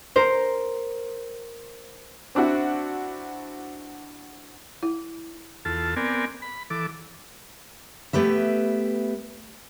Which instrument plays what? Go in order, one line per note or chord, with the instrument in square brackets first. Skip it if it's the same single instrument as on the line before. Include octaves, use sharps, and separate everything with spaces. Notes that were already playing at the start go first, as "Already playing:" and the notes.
[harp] A#4 C5
[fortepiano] C4 D4 E4 F#4
[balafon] E4
[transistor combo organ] E2 F4 A4 A5
B3 C4 A#4 D5 G#5
B5
E3 A4 D6
[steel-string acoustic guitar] A3 B3 G4 B4 E5